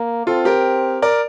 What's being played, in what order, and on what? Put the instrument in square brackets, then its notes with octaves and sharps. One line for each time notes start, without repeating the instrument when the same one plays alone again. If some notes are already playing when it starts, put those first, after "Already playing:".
Already playing: [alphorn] A#3
[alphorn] C4 [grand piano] F4 A4
[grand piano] G4 A#4
A#4 D5